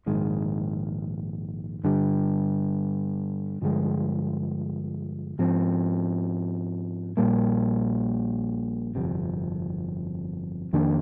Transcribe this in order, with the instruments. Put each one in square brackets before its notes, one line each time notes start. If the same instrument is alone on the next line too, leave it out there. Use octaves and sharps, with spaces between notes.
[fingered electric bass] A#1 G#2 D#3 G#3
G2 D3 G3
G2 D3 F3 G#3
G#2 F3 C4
A#1 A#2 G3 A#3
G1 F2 C3
F2 D#3 A#3 D4